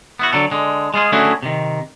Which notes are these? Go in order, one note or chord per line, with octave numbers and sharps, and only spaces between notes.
B3 E4 F#4
D3 F#3 A4
D3 G#3
G#3 F4 G#4
D3 A3 C#4 E4 F#4 G#4
C3 D#3